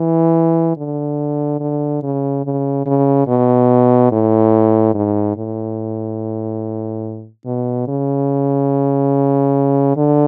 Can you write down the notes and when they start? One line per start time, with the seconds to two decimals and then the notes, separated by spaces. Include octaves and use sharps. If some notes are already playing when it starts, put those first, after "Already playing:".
Already playing: E3
0.77 D3
1.60 D3
2.03 C#3
2.45 C#3
2.86 C#3
3.27 B2
4.12 A2
4.95 G#2
5.37 A2
7.46 B2
7.88 C#3
9.97 D3